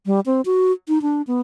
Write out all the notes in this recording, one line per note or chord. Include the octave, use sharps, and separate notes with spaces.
G3
C4
F#4
D#4
D4
B3